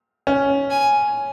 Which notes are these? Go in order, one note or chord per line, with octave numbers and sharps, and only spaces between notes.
C#4
G#5